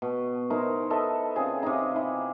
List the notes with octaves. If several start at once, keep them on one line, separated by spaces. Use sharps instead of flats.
B2
D#4 E4 A#4 C5
A4 B4 D#5 E5
C#3 C4 F4 G#4
C3 D#4
E4